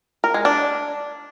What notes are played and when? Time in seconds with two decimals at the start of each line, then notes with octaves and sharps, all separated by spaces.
0.24 A#4
0.34 G#3
0.45 D4